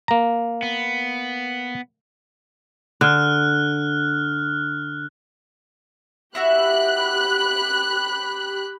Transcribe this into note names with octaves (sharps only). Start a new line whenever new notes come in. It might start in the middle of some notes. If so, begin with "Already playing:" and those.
A#3 A#5
B3
D3 F6 F#6
E4 F#4 G4 E5 B5 F#6